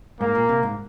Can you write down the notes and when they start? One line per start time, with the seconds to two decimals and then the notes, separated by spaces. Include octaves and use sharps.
0.20 G#2 A#3
0.35 A#2
0.49 C3
0.63 G#2